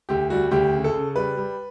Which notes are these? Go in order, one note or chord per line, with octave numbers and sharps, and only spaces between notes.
D2 G4
G3 F#4
D2 G4
C#3
A4
C#3
G3 B4
G3